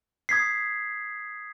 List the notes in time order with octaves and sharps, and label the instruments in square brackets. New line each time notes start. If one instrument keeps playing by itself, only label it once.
[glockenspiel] D#6 G#6 B6 C7